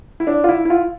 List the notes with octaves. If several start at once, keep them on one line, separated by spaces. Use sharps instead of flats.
E4
D4
F4
E4
E4
F4